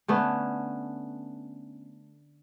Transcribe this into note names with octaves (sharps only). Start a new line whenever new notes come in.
D3 A3 B3 C#4